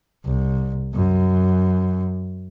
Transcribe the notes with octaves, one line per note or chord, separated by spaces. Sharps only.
C2
F#2